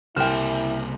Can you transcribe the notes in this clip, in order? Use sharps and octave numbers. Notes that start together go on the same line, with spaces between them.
C2 C#3 A#3 E4 G5 G#5 F6 E7